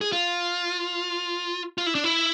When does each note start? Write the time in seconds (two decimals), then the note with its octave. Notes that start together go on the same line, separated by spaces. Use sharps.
0.01 G#4
0.12 F4
1.78 F4
1.87 E4
1.95 D4
2.04 E4